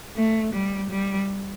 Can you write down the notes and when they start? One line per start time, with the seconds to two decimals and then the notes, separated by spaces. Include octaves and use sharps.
0.16 A3
0.54 G3
0.91 G3